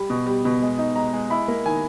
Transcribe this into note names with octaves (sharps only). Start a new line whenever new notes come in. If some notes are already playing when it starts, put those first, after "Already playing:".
Already playing: G3 B5
B2
G3
B2
G#3
D#4
G#3 A#5
G#3
E4 B5
A#3
D#3 G#5